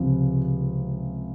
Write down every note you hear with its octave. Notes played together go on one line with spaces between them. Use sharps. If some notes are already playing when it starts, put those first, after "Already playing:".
Already playing: C#2 C3 F3